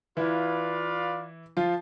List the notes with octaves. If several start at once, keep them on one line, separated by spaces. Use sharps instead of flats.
E3 E4 F4 B4 D5 F5
F3 F4